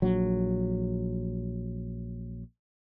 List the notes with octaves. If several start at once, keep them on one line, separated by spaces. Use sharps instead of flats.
A#1 F#3